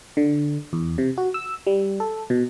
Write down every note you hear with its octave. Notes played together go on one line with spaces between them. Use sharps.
D3
E2
C3
F#4
E6
G3
A4
B2